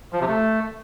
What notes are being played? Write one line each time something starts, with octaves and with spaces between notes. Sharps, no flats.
F3
C3
A3